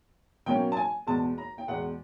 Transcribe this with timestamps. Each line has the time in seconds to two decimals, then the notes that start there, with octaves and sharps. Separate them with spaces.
0.46 B2 F#3 A#3 C#4 G5
0.72 A5
0.77 G#5
1.07 E2 B2 G#3 A5
1.38 A#5
1.58 G5
1.68 E2 B2 G#3 F#5